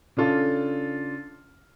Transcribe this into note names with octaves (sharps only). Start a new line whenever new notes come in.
C#3 D4 F4 A4